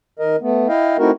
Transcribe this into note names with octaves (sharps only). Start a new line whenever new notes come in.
D#3 A#4 D#5
A3 B3
E4 D#5 F5 G5
A3 C4 D#4 E4 F#4 A#4